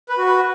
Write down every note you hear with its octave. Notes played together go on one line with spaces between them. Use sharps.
B4
F#4
B4